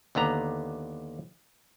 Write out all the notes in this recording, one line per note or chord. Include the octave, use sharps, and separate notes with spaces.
D#2 D3 B3 A#5